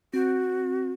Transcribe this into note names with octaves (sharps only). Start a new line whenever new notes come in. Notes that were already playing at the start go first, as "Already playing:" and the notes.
C4 F#4